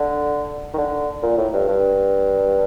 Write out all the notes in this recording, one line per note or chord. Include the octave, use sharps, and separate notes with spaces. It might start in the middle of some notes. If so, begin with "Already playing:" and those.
Already playing: D3
D#3
D3
A#2
A2
G2
G2